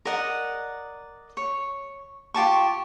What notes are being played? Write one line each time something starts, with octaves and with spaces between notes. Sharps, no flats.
A#4 D5 D#5 F#5
C#5
F4 G4 A5 C#6